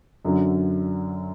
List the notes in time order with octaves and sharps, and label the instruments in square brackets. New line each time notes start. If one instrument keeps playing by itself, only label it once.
[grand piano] F#2 D3 F#3